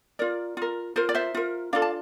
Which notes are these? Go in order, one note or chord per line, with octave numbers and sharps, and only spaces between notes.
F4 A#4 D5
F4 A#4
F4 A#4 C5
D5
C5 E5
F4 A#4
D4 F4 A4 D5 F5
A5